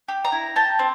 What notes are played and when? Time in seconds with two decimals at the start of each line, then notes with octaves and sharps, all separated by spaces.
0.08 G4
0.25 A#5
0.32 E4
0.56 G4 A5
0.79 C4